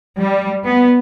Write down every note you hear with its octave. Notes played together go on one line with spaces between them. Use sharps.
G3
B3